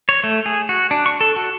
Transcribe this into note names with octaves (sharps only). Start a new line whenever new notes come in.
C#5
A3
G#4
F#4
D4
C#6
A4
F#4